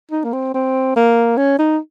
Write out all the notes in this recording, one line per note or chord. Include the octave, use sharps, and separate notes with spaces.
D#4
A#3
C4
C4
A#3
C#4
D#4